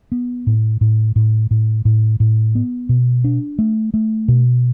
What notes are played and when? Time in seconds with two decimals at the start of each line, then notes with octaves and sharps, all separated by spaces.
0.12 B3
0.47 A2
0.81 A2
1.16 A2
1.51 A2
1.85 A2
2.20 A2
2.55 B3
2.89 B2
3.24 D4
3.59 A3
3.94 A3
4.28 B2